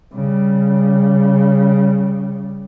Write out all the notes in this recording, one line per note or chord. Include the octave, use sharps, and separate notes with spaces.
C#3 G3